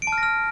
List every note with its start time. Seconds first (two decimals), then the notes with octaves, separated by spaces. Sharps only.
0.02 D7
0.07 A5
0.12 F6
0.18 A#6
0.23 F6